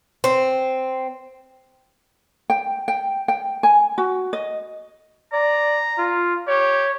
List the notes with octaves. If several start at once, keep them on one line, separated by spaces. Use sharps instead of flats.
C4
G5
G5
G5
G#5
F#4
D#5
D5 A#5
F4
G4 C#5